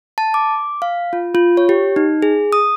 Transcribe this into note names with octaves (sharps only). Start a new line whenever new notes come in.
A5
D6
F5
F4
F4
C#5
G4
D#4
G#4
D#6